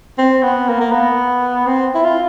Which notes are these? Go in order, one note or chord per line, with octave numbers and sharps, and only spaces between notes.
C4
B3
A#3
A#3
B3
C4
E4
F4